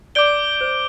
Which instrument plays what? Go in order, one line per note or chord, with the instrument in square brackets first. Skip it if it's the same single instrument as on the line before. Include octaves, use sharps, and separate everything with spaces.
[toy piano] D5 [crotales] D6 G6 D7 G7
[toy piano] C5